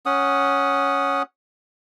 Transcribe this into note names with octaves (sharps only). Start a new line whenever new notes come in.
C#4 F#5 D#6